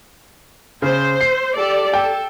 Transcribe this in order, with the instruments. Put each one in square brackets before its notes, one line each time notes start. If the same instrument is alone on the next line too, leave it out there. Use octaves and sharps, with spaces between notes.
[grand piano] C#3 [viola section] C5
[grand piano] C7
[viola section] G4 A4 D5
[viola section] A4 [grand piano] G5